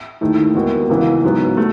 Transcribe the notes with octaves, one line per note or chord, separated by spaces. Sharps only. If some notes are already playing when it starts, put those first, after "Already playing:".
D#2 D#3 A3 E4
D#2 D#3 G#3 B3 F#4
C#2 C#3 E3 B3
G#2 F#3 B3
A3